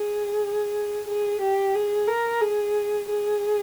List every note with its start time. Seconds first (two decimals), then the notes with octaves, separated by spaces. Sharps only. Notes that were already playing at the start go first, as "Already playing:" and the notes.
Already playing: G#4
1.08 G#4
1.41 G4
1.75 G#4
2.08 A#4
2.41 G#4
3.09 G#4